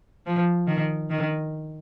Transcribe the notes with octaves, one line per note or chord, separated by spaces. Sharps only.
F3
D#3
D#3